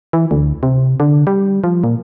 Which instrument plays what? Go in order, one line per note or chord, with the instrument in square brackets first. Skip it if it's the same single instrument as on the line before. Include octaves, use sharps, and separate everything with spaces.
[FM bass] E3
D2
C3
D3
G3
F3
A#2